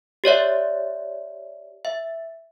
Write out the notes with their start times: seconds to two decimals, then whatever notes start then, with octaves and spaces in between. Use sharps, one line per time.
0.24 G4 C#5 D5 E5
1.85 E5